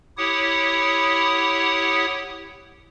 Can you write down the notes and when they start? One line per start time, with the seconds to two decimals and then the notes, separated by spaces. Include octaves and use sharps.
0.17 E4 G4 C#5 F#5 D#6